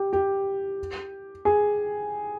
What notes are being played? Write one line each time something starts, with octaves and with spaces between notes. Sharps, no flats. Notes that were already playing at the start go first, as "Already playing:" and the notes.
Already playing: G4
G4
G#4